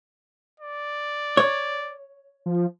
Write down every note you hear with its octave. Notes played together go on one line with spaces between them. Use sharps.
D5
C#5
F3